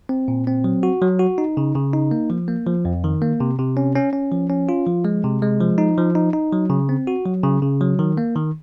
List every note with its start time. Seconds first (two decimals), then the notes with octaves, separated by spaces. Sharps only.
0.09 C4
0.28 A#2
0.47 C4
0.64 F#3
0.83 F#4
1.02 F#3
1.19 F#4
1.38 D#4
1.57 C#3
1.75 C#3
1.93 D#4
2.11 A#3
2.30 F3
2.48 A#3
2.67 F3
2.85 F2
3.04 D#3
3.22 A#3
3.40 C3
3.59 C3
3.77 C#4
3.95 C#4
4.13 C#4
4.32 F3
4.50 C#4
4.69 F4
4.87 F3
5.05 G#3
5.24 C3
5.42 G#3
5.61 F3
5.78 D#4
5.97 F3
6.15 D#4
6.33 D#4
6.53 F#3
6.70 C#3
6.89 C4
7.07 F#4
7.26 F#3
7.43 C#3
7.62 C#3
7.81 F#3
7.99 D#3
8.18 A#3
8.36 D#3